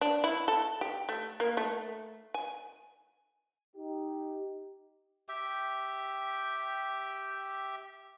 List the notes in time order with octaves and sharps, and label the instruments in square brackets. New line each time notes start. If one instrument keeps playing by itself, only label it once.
[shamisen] D4
E4
A4
G4
A3
A#3
A3
G#5
[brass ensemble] D#4 G4
[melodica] G4 E5 G5